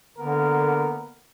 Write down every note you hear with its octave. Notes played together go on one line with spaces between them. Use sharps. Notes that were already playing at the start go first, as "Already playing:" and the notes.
D3 A#3 B3 A#4